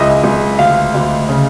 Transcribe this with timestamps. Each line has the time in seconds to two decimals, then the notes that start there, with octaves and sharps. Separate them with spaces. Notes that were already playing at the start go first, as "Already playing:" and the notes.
Already playing: C#2 C#3 D#5 E5
0.24 C#2
0.58 D2 F5
0.94 D2
1.29 C#3